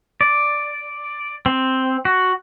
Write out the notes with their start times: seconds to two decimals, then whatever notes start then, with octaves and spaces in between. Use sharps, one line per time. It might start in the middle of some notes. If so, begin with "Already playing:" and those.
0.21 D5
1.46 C4
2.05 F#4